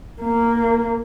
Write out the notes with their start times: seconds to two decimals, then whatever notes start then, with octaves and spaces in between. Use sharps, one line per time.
0.21 A#3